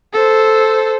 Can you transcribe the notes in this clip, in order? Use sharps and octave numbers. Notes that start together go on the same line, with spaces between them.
A4 C5